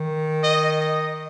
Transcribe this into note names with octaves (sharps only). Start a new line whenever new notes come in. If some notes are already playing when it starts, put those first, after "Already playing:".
Already playing: D#3
D#5
D#5